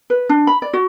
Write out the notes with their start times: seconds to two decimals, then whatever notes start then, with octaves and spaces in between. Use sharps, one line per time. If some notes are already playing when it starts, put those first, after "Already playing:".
0.10 B4
0.29 D4
0.47 B5
0.62 D5
0.73 F#4